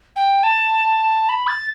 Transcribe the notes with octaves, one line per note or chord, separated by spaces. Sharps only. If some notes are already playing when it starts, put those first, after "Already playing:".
G5
A5
B5
A6